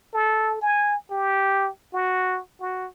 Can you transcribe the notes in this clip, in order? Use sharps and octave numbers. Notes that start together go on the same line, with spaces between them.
A4
G#5
G4
F#4
F#4